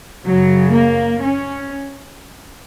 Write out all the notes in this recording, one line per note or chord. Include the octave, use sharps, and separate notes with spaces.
F#2 C#3 F#3
A#3
C#4